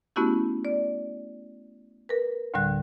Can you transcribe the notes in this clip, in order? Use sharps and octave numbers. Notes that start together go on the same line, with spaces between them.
A3 B3 C#4 E4 F#4 G4
D5
A#4 B4
D2 A2 D3 G3 F#6